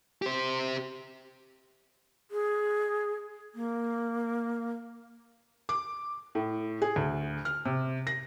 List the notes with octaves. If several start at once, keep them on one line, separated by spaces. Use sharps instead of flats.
G4 C5
G#4
A#3
D6
A2
G#4
D2
F6
C3
A#6